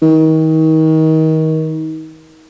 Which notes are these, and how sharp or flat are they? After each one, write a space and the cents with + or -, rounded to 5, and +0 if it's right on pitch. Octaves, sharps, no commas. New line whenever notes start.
D#3 +30